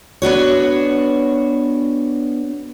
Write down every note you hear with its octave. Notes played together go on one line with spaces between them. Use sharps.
B3 D4 F#4 C#5